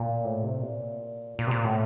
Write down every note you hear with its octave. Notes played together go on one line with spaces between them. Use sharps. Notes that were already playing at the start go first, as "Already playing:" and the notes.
Already playing: A#2
A2
C3
A#2
A#2
C3
A#2
A2